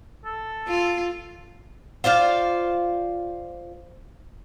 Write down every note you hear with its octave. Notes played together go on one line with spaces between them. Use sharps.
A4
F4
F4 C5 D5 F5